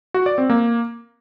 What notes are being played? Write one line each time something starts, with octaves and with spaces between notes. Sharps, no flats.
F#4
D5
C4
A#3